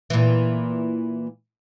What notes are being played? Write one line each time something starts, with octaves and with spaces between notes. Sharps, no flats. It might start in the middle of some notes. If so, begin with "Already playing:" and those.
A#2 E3